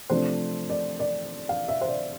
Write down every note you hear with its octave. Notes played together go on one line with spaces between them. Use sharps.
C3 F3 A3 D4 C5
D5
D5
F5
E5
C5
D5